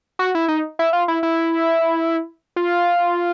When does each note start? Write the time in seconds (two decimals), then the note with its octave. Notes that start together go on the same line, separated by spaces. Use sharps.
0.19 F#4
0.35 E4
0.48 D#4
0.79 E4
0.93 F4
1.08 E4
1.23 E4
2.56 F4